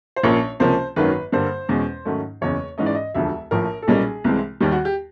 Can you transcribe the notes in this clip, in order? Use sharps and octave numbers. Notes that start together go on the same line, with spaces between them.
C5
A#1 A#2 F3 A#3 C#4 C#5
C#2 C3 F3 A#3 C#4 C5
G#1 F#2 D#3 F#3 A#3 B4
G2 D3 G3 A#3 C5
E2 B2 G#3 C#4
G#2 D#3 F#3 A3 C#4
F#1 E2 C#3 C#5
G#2 E3 G#3 C#4 D#5
D5
D#5
E1 D2 D3 F3 E5
A#1 A2 F3 A#4
A4
B1 A#2 G3 A#3 C#4 G#4
C2 C3 E3 G#3 C4
D#2 D#3 G3 G4
F#4
G4